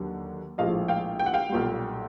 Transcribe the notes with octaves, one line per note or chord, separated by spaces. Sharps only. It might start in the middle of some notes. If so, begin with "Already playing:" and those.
Already playing: D#2 D3 F#3
A#1 A2 F3 G#3 D#5 F5
F5 G5
G5
F#5
F5 G5
B1 A#2 G3